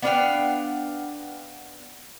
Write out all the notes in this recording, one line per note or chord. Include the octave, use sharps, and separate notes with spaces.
B3 D4 F5 G5